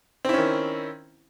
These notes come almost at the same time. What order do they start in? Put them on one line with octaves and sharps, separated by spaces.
C4 E4 C#4 D#3